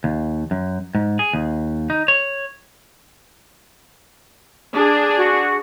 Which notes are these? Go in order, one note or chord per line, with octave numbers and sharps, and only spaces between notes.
D#2
F#2
G#2
G#4
D#2
D#4
C#5
D4 G#4
F#4